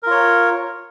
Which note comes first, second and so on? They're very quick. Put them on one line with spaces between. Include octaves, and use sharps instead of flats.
A#4 F4 C#5